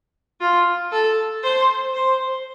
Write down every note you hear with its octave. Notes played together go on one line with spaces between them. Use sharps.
F4
A4
C5
C5